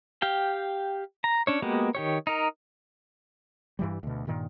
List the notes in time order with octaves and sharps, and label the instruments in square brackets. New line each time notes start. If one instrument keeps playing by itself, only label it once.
[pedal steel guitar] G4 F5 G5
A#5
C#4 D4 C#5
G#3 A#3 B3 F#4 G4
D#3 G4 C#5
D#4 A#4
[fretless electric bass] G2 E3 G3
D2 B2
G2 A#2 D#3